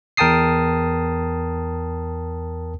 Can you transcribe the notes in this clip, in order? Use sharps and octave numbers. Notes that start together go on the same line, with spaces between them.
E2 A#4 G5 A5 D#6 C7